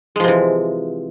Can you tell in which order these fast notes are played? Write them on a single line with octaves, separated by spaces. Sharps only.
G#3 F3 C3 E3